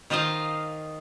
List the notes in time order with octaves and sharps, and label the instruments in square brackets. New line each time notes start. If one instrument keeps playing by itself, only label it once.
[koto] D#3 F4 C5 D#5 F5